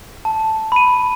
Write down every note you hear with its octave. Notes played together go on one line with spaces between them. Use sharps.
A5
B5 D#7